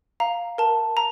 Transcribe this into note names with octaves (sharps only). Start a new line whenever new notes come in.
F5 A#5
A#4 A5
A#5